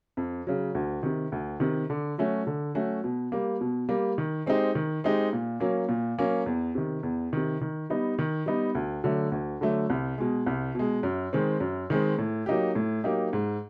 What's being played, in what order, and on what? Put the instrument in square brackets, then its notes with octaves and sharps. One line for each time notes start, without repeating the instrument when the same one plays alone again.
[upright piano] F2
C#3 F#3
D2
C3 D#3
D2
C3 D#3
D3
F#3 A3 C#4 F#4
D3
F#3 A3 C#4 F#4
B2
G3 A#3
B2
G3 A#3
D#3
G#3 C4 D#4 G4
D#3
G#3 C4 D#4 G4
A#2
F#3 A#3 C#4
A#2
F#3 A#3 C#4
E2
C3 D#3
E2
C3 D#3
D#3
G3 B3 D#4
D#3
G3 B3 D#4
D2
D3 F#3 A3
D2
D3 F#3 A3
C2
B2 G#3
C2
B2 G#3
F#2
D#3 G#3 C4
F#2
D#3 G#3 C4
A2
F#3 A#3 D#4 G4
A2
F#3 A#3 D#4 G4
G#2